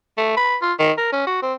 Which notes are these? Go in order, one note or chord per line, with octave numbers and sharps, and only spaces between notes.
A3
B4
F4
D#3
A#4
C#4
F#4
C4